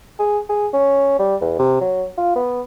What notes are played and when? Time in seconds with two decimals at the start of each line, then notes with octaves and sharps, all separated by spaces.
0.19 G#4
0.50 G#4
0.73 C#4
1.19 G3
1.41 E2
1.59 C3
1.81 F#3
2.18 F4
2.36 B3